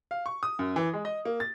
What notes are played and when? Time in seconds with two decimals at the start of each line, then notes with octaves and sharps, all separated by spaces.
0.11 F5
0.26 C#6
0.43 D#6
0.59 F#2
0.76 E3
0.94 G#3
1.05 D#5
1.25 A#3
1.40 A6